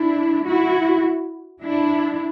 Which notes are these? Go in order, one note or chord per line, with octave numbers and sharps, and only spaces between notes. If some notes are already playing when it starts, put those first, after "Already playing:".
Already playing: D4 E4
E4 F#4
D4 E4